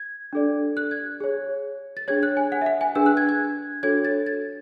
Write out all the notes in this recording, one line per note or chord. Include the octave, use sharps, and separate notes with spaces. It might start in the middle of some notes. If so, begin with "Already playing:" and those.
Already playing: G#6
D4 A4 D5
F#6
G#6
G#4 C#5
A6
D4 G#4 C#5 G#6
F#6
G#5
F#5
E5
F#5
G#5
D4 G#4 B4 E6
F#6
G#6
G#6
D4 F#4 A4 C#5 G#6
A6
A6